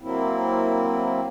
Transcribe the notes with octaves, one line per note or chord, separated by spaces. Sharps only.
F#3 A#3 C4 E4